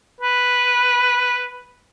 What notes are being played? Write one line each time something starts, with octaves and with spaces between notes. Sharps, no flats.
B4